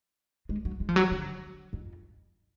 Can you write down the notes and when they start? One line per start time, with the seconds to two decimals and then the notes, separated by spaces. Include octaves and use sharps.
0.49 G#3
0.65 F#3
0.80 G#3
0.89 F3
0.96 F#3
1.11 D3
1.73 F2